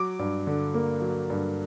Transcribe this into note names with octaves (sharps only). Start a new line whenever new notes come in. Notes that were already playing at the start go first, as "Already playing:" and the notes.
Already playing: F#3 D6
G2
D3
A#3
F#3
G2